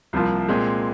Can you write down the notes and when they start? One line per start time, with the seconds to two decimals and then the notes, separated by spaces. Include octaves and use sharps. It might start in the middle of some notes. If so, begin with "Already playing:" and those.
0.13 C2 C3 F3 A#3 F4
0.48 A#2 G#3 C4